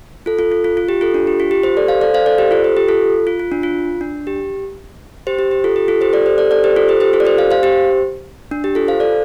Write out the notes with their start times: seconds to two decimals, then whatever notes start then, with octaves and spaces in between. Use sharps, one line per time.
0.26 F4 A4
0.39 F4 A4
0.52 F4
0.64 F4
0.77 F4
0.89 G4
1.01 F4 A4
1.14 D4
1.27 G4
1.40 F4
1.51 G4
1.63 G4 C5
1.77 A4 D5
1.88 C5 F5
2.01 A4 D5
2.14 C5 F5
2.26 A4 D5
2.38 G4 C5
2.51 F4 A4
2.64 G4
2.77 G4
2.88 F4 A4
3.27 F4
3.39 F4
3.52 D4
3.63 F4
4.01 D4
4.27 G4
5.27 G4 C5
5.39 G4
5.51 G4
5.64 F4 A4
5.76 G4
5.88 F4 A4
6.01 G4 C5
6.13 A4 D5
6.26 G4 C5
6.38 A4 D5
6.51 A4 D5
6.64 G4 C5
6.76 F4 A4
6.89 G4 C5
7.00 G4 C5
7.13 F4 A4
7.20 D5
7.25 G4 C5
7.38 C5 F5
7.51 C5 F5
7.63 G4 C5
8.51 D4
8.64 G4
8.75 F4 A4
8.88 C5 F5
9.00 A4 D5